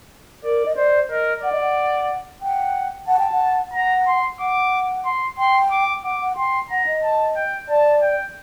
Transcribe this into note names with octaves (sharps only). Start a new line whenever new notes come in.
A#4 D5
D#5
C5 D5
A#4 D#5
D5 F#5
D#5
F#5
F#5 G5
F#5 A5
G5
F#5
F#5 A#5
C6
F#5 D6
C6
G5 C6
D6
F#5 D6
F#5
G5 C6
F#5 A#5
D#5
A5
G5
D5 A5
G5